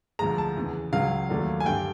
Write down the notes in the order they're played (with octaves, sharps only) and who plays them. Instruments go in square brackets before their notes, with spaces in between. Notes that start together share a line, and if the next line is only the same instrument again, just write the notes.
[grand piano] D2 D3 F3 G#3 A#5
A5
E2 C#3 E3
C#2 C#3 F#3 F5
D#2 D#3 F#3 A3 D4
G#5
G2 D3 G3 G5